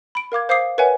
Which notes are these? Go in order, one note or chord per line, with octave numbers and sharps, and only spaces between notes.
B5 D7
A#4 F5 D6 G#6
C5 F5 D6 D#6 C7
A#4 B4 C#5 E5 F#5 G#5